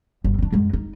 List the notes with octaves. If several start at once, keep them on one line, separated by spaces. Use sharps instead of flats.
G1
C4 D4
F#2 G#3
D#4